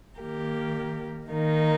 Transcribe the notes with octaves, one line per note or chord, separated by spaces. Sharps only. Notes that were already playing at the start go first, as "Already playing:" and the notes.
D#3 A#3 G4 A#4
D#3 A#3 D#4